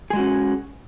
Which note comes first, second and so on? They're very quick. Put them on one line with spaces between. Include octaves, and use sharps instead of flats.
G#4 G#3 F#4 C#4